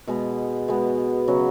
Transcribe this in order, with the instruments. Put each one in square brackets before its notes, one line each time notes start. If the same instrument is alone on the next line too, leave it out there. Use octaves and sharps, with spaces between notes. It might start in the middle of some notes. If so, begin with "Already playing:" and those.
[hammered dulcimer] B2 G#3 B3
B2 G#3 B3
C#3 F#3 B3